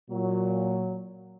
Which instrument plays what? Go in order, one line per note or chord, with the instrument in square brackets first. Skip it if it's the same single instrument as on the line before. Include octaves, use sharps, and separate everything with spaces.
[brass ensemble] A#2 F#3